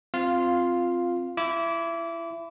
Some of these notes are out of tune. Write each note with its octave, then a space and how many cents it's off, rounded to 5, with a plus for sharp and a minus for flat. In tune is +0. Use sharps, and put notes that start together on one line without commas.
C4 +0 F4 +0 F5 +10
E4 +25 D6 -25